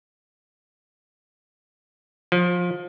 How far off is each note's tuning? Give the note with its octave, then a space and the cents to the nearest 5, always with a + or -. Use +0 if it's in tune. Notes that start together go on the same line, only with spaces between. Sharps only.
F3 +20